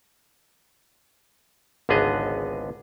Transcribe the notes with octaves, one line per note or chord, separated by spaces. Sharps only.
G#1 C#2 D3 B3 G#4 D#5